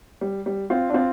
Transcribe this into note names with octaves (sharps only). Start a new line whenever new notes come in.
G3
G3
C4 F4
D4
C4 F4